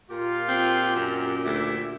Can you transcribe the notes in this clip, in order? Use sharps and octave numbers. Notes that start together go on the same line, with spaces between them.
A#2 F4 G4 A#4
C4
F#2
D2 E5